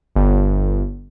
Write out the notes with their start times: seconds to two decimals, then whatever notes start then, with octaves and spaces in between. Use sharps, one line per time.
0.16 G1